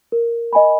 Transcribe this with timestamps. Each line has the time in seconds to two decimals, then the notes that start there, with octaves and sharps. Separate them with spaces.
0.12 A#4
0.53 D#5 G#5 B5